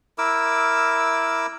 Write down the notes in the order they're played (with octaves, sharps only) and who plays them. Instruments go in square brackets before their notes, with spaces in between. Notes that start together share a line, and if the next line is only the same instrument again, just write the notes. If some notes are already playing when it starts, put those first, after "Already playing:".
[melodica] E4 A#4 D6 E6